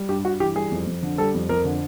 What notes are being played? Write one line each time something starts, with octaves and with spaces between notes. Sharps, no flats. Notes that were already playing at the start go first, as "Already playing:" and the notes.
Already playing: G3
G2 G4
G2 F#4
E3 G4
G3 G#4
F2
F2
D3
G3 A4
F2
F2 A#4
D3